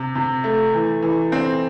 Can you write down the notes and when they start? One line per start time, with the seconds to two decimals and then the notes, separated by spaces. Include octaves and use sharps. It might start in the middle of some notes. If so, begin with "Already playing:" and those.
Already playing: C3
0.15 C3
0.44 A3
0.74 E3
1.02 E3
1.32 C4